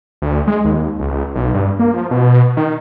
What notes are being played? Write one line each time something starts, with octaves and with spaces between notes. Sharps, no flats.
D2
G#3
D#2
C#2
B1
G2
A#3
F3
B2
D#3